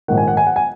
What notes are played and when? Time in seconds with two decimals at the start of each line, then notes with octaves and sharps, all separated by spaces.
0.08 A#1 G#2 D#3 F#5
0.17 G#5
0.28 F#5
0.37 G#5
0.47 F#5
0.56 G#5